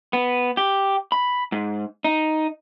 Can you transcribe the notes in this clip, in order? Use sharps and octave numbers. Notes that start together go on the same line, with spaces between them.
B3
G4
B5
G#2
D#4